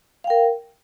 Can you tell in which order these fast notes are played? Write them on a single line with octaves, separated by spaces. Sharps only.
F5 G5 A#4